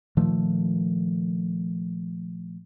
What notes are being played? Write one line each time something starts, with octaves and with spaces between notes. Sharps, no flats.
A#2 D#3 F3 A3